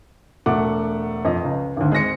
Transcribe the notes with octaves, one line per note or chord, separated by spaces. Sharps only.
E1 A3 F#5 D6
F2 D#5
C#2
G#1 D2
G#3 C4 A#6 C#7